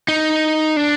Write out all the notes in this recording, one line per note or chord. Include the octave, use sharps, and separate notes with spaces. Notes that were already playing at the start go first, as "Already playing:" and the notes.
D#4
D4